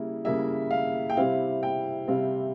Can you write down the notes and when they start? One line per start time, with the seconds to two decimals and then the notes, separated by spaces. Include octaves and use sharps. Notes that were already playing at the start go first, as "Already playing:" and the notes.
Already playing: C#3 G3 A#3 E4
0.25 C#3 G3 A#3 E4 E5
0.71 F5
1.10 G5
1.17 C3 G3 C4 E4 F5
1.63 G5
2.08 C3 G3 C4 E4 F5